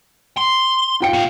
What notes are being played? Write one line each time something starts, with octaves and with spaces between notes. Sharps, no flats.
C6
F4 G5 C#7
B2 F5